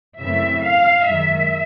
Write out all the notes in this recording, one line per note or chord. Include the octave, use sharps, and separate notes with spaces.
F#2 C#3 E3 A3 C4 E5
F5
F#2 D#3 G#3 E5